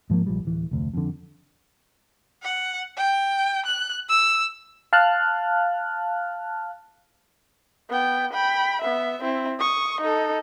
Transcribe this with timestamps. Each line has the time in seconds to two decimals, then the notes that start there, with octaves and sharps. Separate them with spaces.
0.10 G#2 F3 F#3 A#3
0.26 A#1 F3 G3
0.45 D1 E3
0.71 F1 D2
0.93 F2 D3
2.43 F#5
2.97 G5
3.66 F#6
4.09 E6
4.93 F5 A5 F6 F#6
7.89 B3 G5
8.33 G5 B5
8.81 B3 E5
9.22 C4 E4
9.59 C#6 D#6
10.01 D#4 A4